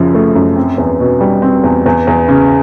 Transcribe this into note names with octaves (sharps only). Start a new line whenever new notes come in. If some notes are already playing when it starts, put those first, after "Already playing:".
Already playing: F#2 C#3 F3
A3
F#2
C4
E2
B2
G3
C4
E2
E2
E2
C#3